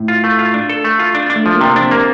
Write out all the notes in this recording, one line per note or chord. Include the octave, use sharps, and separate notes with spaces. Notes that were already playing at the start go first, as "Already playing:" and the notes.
Already playing: A2
F4
A3
F4
D4
A4
A3
F4
D4
D4
A3
F3
C3 A#3
C4 D4
A#3